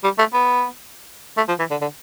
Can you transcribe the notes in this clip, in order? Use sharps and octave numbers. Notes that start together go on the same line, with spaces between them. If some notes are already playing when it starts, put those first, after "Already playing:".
G3
A3
B3
A3
F3
E3
D3
D3